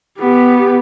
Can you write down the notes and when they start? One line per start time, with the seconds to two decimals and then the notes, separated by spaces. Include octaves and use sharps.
0.19 B3 G4